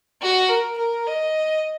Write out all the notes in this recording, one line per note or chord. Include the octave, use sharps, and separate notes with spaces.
F#4
A#4
A#4
D#5